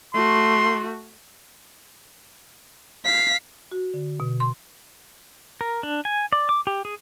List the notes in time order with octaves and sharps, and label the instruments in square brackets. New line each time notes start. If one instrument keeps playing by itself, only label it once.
[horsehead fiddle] A3 F#4 [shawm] C6
[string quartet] F5 [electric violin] B6
[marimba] F#4
D3
B2
C6
[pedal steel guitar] A#4
D4
G#5
D5
D6
G4
G#4